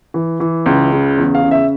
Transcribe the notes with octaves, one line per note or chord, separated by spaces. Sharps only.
E3
E3
C#2
C#3
E2
F5
C#3
E5